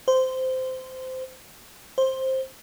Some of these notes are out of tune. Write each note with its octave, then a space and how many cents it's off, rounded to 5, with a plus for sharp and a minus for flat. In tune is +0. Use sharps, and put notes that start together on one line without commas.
C5 -15
C5 +10